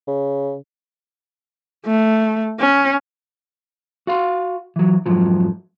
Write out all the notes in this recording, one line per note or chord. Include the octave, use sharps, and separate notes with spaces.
C#3
A3
C#4
F#4 F5 C6
E3 F#3
F2 G#2 F3 F#3